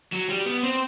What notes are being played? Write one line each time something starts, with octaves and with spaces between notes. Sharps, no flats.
F#3
G3
B3
C4